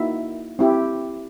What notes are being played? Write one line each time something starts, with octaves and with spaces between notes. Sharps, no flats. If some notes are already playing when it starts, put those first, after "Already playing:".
Already playing: A#3 D#4 E4 F#4 E5
C4 E4 G4